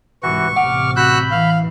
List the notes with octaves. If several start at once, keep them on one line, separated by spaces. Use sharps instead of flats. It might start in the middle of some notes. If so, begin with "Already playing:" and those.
C2 G#2 E3 F#4 C#6
A1 C3 F#5 D6 F6
F#4 B5 E6 F#6 G6
E3 F5